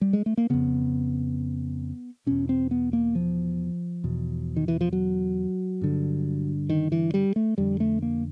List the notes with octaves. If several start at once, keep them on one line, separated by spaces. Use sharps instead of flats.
G3
G#3
A3
A#3
F2 C#3 B3
E2 B2 C#4
C4
B3
A#3
F3
E2 B2
D#3
E3
F3
F#3
G2 D3
D#3
E3
G3
A3
F2 D3 G3
A3
A#3